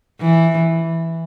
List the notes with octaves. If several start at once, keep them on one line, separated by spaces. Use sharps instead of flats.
E3